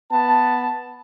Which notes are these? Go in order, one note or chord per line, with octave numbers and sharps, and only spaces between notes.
B3 A5